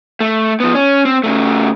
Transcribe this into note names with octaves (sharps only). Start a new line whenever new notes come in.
A3
F3 B3
C#4
C4
C#3 A3